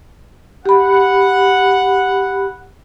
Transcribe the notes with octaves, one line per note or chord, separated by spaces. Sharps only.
G4 F#5 B5